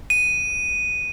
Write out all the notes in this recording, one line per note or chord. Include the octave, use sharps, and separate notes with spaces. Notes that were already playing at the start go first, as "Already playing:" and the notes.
D#7